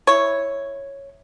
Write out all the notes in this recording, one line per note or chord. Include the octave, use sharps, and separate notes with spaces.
E4 C#5